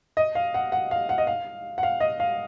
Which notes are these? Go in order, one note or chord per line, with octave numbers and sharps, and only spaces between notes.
D#5
F5
F#5
F#5
F5
F#5
D#5
F5
F#5
F5
D#5
F5